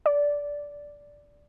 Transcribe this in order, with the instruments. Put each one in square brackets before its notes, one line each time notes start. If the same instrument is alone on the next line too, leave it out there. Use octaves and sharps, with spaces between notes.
[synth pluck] D5